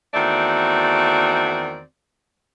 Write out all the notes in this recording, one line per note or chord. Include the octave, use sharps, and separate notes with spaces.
E2 D#3 A3 C4 F#4 D5